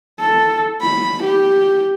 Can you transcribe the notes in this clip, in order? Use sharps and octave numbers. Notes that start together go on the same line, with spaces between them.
A4
B5
G4